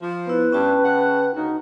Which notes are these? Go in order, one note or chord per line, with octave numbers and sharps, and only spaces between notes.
F3
B3 E4 B4
G2 C#4 G5 A5
C#3 F#5
D2 C#3 D#4 F#4